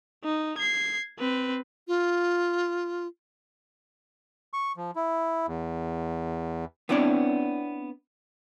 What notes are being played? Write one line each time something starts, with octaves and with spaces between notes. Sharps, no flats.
D#4
G#6 C7
C4 B4
F4
C#6
F3
E4
E2
B3 C4 D4 E4 C#5 D5